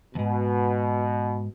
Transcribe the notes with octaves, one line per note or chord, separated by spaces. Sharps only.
D#2 G#2 B2